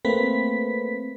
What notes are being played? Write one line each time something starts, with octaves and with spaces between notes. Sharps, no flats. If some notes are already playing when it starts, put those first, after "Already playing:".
A3 A#3 C4 B4 B6